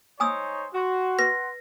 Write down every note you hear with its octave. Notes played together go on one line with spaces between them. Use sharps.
D#4 C5 C#5 G#5 D#6 E6
F#4 F#5 C6
B4 A#6